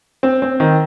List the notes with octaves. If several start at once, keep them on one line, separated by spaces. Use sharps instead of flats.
C4
C4
D#3